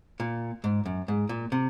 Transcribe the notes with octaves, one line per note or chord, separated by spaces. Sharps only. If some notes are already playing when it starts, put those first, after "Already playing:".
A#2
G#2
F#2
G#2
A#2
C3